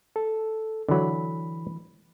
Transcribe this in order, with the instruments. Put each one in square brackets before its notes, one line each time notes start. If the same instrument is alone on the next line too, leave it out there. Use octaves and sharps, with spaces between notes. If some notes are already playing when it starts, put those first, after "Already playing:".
[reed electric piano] A4
[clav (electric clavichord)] D3 F#3 [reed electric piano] E3 B5